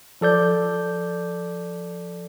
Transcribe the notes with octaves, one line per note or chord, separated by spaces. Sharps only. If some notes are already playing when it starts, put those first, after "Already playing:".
F3 A4 D5 G6